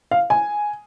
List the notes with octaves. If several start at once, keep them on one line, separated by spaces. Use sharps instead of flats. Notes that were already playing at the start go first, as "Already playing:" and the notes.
F5
G#5